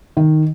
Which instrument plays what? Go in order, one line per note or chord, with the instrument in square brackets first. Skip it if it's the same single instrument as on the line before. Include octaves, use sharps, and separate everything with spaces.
[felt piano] D#3